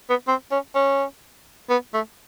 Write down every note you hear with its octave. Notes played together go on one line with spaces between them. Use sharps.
B3
C4
C#4
C#4
B3
A3